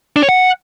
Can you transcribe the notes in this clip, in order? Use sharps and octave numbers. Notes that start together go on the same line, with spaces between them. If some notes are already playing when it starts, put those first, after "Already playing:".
D4
C#5
F#5